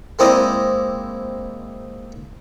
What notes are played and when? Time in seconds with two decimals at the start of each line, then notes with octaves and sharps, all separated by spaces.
0.19 G#3 A#3 C4 E4 D5 D#5